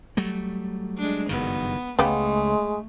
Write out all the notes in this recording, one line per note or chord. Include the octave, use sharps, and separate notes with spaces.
F#3 G3 A3
G#3 D4
F#1 G2 D#3 B3
C#2 C#3 G#3 A3 B3 G4